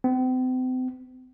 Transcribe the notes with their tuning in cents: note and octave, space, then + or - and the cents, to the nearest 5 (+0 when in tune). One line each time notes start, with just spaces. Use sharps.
C4 -40